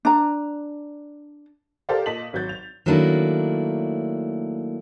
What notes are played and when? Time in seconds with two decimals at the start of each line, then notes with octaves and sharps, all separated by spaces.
0.05 D4 A#5
1.89 G4 A4 A#4 C5 D5 F5
2.06 A#2 D#5 A5 B6 F#7
2.33 G#1 F#3 F#4 G6 A6
2.49 F7
2.86 D#3 F#3 A3 A#3 D4 E4